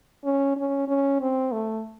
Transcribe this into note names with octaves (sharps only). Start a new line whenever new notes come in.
C#4
C#4
C#4
C4
A3